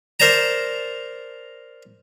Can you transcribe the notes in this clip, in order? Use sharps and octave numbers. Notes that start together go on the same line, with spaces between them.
A#4 C5 D5 A5 A#5